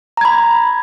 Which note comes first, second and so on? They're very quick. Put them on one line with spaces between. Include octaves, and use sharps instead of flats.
A#5 G#6 B5